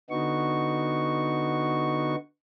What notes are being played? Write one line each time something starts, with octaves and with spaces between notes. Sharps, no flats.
D3 B3 D#4 F#4 C#6